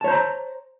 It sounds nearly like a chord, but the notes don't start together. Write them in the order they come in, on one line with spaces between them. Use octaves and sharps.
A5 C#5 C5 A#5